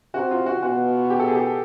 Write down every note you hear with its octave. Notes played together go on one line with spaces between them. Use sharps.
C3 F#4
F4
F#4
B2 F#4
G4
A4
G#4
G4